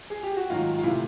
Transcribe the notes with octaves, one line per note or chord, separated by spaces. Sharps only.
G#4
G4
F#4
G#2 D#3 F#3 F4
F4
C3 E3 A3 E4